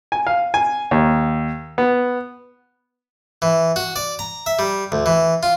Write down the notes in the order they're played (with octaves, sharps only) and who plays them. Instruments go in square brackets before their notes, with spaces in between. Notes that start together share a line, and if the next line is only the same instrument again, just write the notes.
[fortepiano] G#5
F5
G#5
D#2
B3
[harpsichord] E3
F#4
D5
A#5
E5
G3
D2
E3
F4